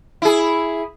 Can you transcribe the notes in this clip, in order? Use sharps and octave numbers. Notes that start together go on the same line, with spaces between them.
E4 G#4